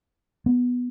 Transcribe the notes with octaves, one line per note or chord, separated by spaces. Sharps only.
B3